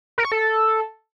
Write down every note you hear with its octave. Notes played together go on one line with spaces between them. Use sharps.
A#4
C#6
A4